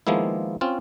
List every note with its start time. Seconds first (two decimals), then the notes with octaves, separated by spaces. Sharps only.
0.07 D#3 F3 G#3 A#3 B3 E4
0.61 C4 C#4 F4